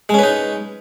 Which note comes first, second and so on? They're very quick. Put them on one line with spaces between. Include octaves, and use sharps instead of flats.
G#3 C#4 B4 D#4